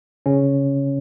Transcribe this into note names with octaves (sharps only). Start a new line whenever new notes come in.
C#3 C#4